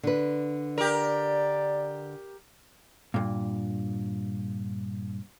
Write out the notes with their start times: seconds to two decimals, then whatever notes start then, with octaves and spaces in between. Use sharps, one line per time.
0.03 D3 B4
0.78 G4 A#4 D5
3.14 G2 A#2